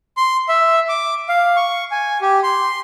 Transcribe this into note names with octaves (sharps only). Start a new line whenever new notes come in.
C6
E5
D6
F5
C#6
G#5
G4
C6